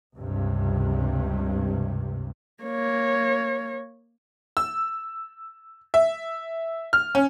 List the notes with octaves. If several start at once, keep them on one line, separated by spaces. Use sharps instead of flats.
C#2 G2 C3
A#3 C#5
E6
E5
F6
C#4